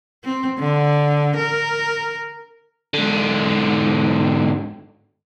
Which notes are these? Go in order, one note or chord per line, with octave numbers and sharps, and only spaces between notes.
C4
D3
A#4
G#2 D3